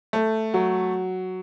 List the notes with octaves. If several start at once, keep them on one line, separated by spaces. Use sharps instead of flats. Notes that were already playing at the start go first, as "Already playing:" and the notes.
A3
F#3